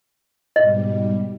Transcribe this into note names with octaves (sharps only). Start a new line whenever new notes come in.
G#2 B2 G3 D#5